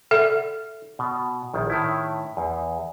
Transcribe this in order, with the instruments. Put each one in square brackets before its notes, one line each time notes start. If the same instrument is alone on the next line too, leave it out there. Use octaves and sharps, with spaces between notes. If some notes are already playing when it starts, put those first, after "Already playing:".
[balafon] A4 E5 [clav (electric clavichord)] D5 F#5
[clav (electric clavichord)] B2
A#1 D#3
A2 D#3 E4
E2